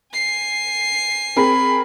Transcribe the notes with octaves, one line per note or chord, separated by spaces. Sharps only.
G#5 C7
C4 G#4 A#4 B5